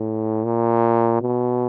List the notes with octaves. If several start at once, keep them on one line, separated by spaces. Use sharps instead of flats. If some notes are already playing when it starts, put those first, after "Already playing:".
Already playing: A2
A#2
B2